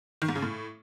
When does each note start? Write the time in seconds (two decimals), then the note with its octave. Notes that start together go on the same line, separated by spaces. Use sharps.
0.22 D#3
0.29 G#2
0.35 C#3
0.42 A2